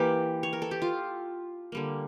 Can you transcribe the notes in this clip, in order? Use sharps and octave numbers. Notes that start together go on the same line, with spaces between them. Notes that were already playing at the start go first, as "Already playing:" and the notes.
Already playing: E3 A#3 G4
C#5
A#4
A4
G4
F4
D3 G3 A#3